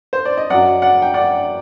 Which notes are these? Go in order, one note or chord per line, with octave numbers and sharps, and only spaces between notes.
C5
D5
D#5
F#2 F#3 D5 F#5
D5 F#5
G5
D5 F#5